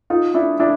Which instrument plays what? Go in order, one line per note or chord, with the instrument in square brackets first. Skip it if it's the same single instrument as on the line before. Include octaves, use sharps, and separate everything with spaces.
[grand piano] D#4 F4
D4 E4
D4 E4